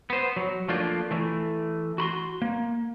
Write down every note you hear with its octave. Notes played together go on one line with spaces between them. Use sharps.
B3 C5
F#3
F3 A3 A#3 D4 F4
E3 A3
F#4 B5 C6
A#3